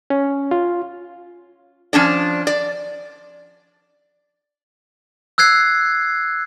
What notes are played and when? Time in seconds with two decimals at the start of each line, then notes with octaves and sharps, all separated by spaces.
0.10 C#4
0.51 F4
1.93 F3 C#4 D4 D5
2.47 D5
5.38 E6 F#6 G#6 C7